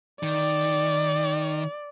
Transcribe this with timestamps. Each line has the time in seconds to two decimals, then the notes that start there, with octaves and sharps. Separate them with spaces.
0.23 D#3 D5